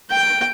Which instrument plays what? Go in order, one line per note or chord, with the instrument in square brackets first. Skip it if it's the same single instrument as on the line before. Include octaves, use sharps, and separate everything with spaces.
[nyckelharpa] G5